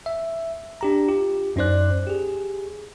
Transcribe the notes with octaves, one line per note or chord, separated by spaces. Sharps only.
E5
D4 G4 A#5
F4 G4
F#2 C#4 D#4 C5 D5 F#6
G4 G#4